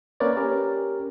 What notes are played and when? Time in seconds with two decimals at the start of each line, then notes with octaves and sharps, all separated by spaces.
0.20 A#3 C#4 A#4 B4 C#5 D5
0.36 C#4 G4 A#4